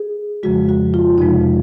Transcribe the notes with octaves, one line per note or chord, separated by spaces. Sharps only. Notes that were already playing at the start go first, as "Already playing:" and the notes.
Already playing: G#4
F2 C#3 F3 G#3 F#4
F#4
F4
F2 C3 F3 G#3 D#4